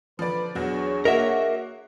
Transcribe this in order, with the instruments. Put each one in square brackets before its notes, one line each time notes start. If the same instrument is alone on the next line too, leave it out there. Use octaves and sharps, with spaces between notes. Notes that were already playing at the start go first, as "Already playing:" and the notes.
[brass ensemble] D3 B4 [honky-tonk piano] F3 D5
[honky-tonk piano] E2 F#3 [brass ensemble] D4 G#4 C#5
[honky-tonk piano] A#3 F#4 D#5 [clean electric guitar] A#4 E5